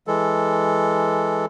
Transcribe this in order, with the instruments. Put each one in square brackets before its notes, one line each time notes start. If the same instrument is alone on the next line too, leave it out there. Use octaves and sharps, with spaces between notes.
[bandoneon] E3 G#3 A4